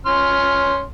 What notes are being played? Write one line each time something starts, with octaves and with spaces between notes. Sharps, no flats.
C#4 C6 F6